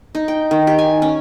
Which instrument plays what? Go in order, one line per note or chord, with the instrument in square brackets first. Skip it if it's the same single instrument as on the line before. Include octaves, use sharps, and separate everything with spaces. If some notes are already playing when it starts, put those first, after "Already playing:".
[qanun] D#4
G5
D#3
G4
G#5
C#4